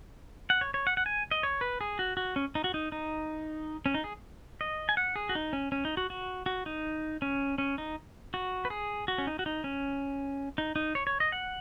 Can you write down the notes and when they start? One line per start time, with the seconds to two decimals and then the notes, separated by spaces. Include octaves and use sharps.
0.50 F#5
0.61 C#5
0.74 C#5
0.87 F#5
0.97 F#5
1.06 G#5
1.31 D#5
1.43 C#5
1.61 B4
1.81 G#4
1.99 F#4
2.17 F#4
2.36 C#4
2.55 D#4
2.64 F#4
2.74 D#4
2.92 D#4
3.86 C#4
3.94 D#4
4.04 G#4
4.61 D#5
4.89 G#5
4.97 F#5
5.16 G#4
5.29 F#4
5.35 D#4
5.53 C#4
5.72 C#4
5.85 D#4
5.97 F#4
6.10 F#4
6.46 F#4
6.66 D#4
7.22 C#4
7.58 C#4
7.78 D#4
8.34 F#4
8.65 B4
8.70 G#4
9.08 F#4
9.18 C#4
9.27 D#4
9.39 F#4
9.46 D#4
9.64 C#4
10.58 D#4
10.76 D#4
10.95 C#5
11.07 C#5
11.20 D#5
11.32 F#5